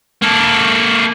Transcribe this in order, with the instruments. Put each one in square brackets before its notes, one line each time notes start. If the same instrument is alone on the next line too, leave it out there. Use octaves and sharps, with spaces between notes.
[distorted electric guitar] A#3 A4